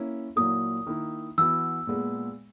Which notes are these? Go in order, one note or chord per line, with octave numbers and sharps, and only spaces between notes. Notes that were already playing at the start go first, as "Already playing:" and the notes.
Already playing: A#3 C#4 E4
A#2 F#3 A#3 E4 A#4 D#6
D#3 A#3 E4
E3 B3 F#4 E6
A#2 G#3 B3